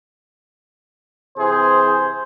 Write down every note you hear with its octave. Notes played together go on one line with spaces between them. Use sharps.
C3 E3 G#4 C5